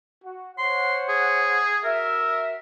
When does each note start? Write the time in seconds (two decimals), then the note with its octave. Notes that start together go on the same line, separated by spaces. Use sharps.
0.23 F#4
0.58 C5 C#5 F#5 C6
1.09 G#4
1.84 F#4 A#4 E5